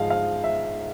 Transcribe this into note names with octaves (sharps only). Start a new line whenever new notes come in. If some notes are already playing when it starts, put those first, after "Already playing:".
Already playing: G#2 F3 G#3 D#5 F5
F5
E5